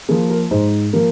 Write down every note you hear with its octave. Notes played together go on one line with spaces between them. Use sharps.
F3 A#3 G#4
A#4
G#2 C5
F3 A#3 A#4